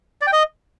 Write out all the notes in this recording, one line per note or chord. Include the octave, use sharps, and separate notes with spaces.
D5
G5
D#5